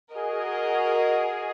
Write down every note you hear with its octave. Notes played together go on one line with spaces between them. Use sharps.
F#4 G#4 A#4 D#5